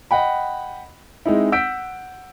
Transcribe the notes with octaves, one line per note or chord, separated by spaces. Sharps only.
D#5 F#5 G5 B5
G#3 C4 D#4 E4
F#5 E6 G6 B6 D7